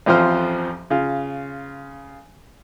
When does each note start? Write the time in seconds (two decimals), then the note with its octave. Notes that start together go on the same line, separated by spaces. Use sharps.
0.06 A1 F2 F3 F4 C5 F6
0.90 C#3 F4